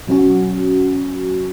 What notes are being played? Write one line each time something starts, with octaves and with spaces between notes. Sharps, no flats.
B2 F#3 C#4 F#4